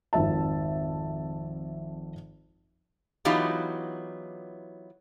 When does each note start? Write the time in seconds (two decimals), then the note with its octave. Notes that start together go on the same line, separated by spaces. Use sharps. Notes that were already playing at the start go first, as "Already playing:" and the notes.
0.13 G#1 F2 F3 E5 A5
3.25 E3 F#3 B3 D#4 F4 G4